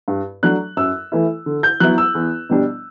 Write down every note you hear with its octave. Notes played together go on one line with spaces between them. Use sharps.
G2
F#3 A3 D4 F#6
F#2 E6
E3 A3 E4
D3
G6
F#3 B3 E4 F#6
E6
E2
B2 G3 D4